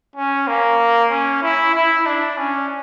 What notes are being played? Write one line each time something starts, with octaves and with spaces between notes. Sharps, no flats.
C#4
A#3
C#4
E4
E4
D4
C#4